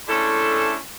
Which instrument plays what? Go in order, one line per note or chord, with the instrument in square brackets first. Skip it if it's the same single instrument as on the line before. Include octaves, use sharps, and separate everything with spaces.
[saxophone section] G#3 A3 C#4 D4 E4 A4